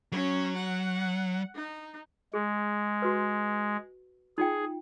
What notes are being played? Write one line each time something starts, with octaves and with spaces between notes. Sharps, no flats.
F#3 C#4
F#5
D#4
G#3 G#4
F#4 B4
D#4 F4 G#4 G5